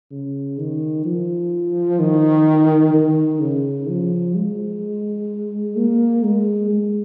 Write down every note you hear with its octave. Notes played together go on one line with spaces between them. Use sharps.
C#3
D#3
F3
D#3
D#3
C#3
F3
G#3
A#3
G#3
G#3